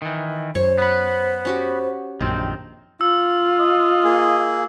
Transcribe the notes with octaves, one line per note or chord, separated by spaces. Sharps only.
D#3 E3
F#2 C5 C#5
B3 B4
C#4 F#4 G4
A#1 F#2 D#3 C4
F4 E6
D#5
A#3 G#4